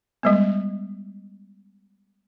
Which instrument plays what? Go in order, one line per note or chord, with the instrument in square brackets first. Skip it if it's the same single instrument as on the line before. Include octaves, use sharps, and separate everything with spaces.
[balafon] G3 G#3 B3